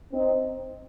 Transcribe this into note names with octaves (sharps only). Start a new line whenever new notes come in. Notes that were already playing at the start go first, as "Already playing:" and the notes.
C4 D#4